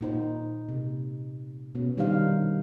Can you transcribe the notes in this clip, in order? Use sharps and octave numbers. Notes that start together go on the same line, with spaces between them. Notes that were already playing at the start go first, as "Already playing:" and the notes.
A#2 D#4 C5
C3
B2 B3 C#4
D#3 G3 D4 D#4 C5 F5